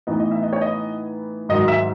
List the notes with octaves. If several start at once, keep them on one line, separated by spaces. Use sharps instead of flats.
A2 E3 B3 D#4 D#5
D#5
E5
D#5
C#5
D#5
G#2 D#3 F#3 D#5
E5